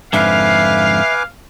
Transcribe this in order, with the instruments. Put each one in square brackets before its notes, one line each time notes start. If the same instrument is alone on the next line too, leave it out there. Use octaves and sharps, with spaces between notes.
[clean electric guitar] F2 G#2 D3 [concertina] B4 G#5 D6 [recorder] E5 [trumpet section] F5